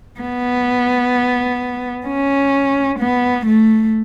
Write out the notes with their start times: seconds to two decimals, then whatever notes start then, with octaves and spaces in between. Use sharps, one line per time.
0.20 B3
2.07 C#4
2.99 B3
3.46 A3